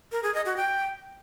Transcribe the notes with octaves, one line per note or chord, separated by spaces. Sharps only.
A#4
G#4
D#5
F#4
G5